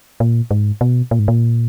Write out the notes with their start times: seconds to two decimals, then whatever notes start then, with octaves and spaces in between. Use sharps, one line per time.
0.20 A#2
0.51 G#2
0.81 B2
1.11 A#2
1.19 G#2
1.28 A#2